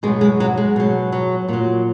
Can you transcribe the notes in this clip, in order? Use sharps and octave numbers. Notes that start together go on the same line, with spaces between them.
B2 F#3 G#3
G#3
F#3
G#3
B2 F#3
F#3
A#2 F#3